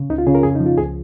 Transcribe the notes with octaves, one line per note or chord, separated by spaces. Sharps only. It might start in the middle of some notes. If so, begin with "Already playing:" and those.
Already playing: C#3
C#2 D#4
F4
C#3 G#4
A#4
F2 G#4
D#4
F3
F4
C#2 G#4